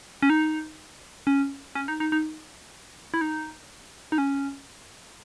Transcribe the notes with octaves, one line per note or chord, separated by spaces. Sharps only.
C#4
D#4
C#4
C#4
D#4
D#4
D#4
E4
D#4
D#4
C#4